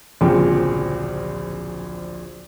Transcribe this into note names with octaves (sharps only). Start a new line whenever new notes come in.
D1 A#1 A#2 C#3 C4 G5